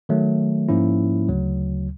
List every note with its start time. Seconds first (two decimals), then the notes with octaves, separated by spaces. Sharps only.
0.09 D#3 F#3 A3
0.69 G#2 F3 A#3 C#4 E4
1.28 D2 C#3 F#3